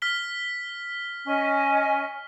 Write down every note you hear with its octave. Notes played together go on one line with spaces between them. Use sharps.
F6 B6 G7
C#4 D#5 G#5